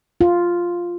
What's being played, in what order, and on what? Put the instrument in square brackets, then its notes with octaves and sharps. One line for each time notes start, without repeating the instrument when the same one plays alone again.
[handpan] F4